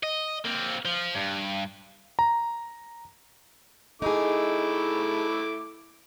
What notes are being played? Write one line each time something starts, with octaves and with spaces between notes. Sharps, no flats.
D#5
A#3 C4
F3
G2
A#5
A3 D#4 E4 G#4 D6